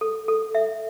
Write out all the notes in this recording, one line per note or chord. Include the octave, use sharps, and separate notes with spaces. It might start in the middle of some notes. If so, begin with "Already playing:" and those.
A4
A4
E5